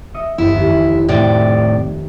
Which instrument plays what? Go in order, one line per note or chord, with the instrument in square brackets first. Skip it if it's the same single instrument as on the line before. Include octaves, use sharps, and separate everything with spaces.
[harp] D#5 E5 C#7
[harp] G1 [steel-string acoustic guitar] E4
[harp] F1 D#2
[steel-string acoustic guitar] A2 C3 D5